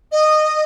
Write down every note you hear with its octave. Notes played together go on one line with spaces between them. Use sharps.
D#5